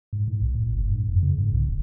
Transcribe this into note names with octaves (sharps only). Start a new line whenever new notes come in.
G#2
A2
B1
A2
F#1
G2
F2
C#3
G#2
B1
E1